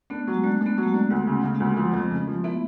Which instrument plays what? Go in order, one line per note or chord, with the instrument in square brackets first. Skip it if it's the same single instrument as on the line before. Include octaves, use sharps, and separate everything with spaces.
[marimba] A3 B3 [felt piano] D4
[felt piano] F#3
[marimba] G#3
[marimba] G3 A3 [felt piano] D4
[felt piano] D4
[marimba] A3 B3
[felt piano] F#3
[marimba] A3
G#3 A#3
[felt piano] D4
[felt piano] D2 [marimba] G3 A3
[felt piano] C#3
C#3
[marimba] G#3 A#3
[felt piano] D2
F3
F2
C#3
F3
[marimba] A3 B3 [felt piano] E4